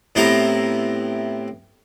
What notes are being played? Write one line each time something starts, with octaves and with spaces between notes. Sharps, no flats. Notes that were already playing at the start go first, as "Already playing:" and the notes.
A2 B3 C4 E4 G4 A#5